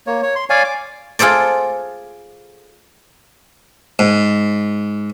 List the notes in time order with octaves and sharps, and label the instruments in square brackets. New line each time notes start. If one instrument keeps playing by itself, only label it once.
[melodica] A#3 C#5
C#5
C6
C#5 D5 F5 G#5
D6
[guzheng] F4 G#4 A4 C5 D5
[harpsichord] G#2